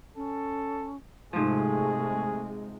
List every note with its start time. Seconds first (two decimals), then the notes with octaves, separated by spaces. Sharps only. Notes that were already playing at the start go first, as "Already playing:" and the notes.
0.16 C#4 A4
1.33 G#2 C3 F3 G#3 A3 G#4